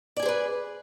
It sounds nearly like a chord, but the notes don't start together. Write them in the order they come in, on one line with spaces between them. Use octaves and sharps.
D5 G#5 G#4 C5 B4